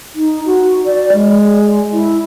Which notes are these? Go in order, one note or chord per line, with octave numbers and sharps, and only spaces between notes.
D#4
F#4
D5
G#3
E4